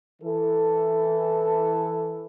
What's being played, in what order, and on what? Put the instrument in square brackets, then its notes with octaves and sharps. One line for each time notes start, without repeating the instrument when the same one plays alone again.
[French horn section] E3 A4